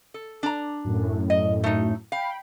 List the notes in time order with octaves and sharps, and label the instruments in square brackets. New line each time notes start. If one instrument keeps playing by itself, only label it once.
[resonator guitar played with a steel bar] A4
D4 A#5
[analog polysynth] F#2 A2
[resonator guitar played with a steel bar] D#5
A3 D#4
[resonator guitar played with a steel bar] F5 [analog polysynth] G5 B5